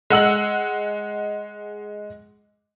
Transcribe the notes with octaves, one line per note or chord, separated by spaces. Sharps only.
G#3 F#5 E6 F#7